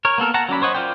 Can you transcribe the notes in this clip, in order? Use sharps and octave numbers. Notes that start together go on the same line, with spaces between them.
A#4 C#5
A#3 B3 A4 A#4
F#5 A5 A#5
F#3 C#4 D5 B5
C5 C#5 D#5 F#5
F4 A#4 C5 D5 G5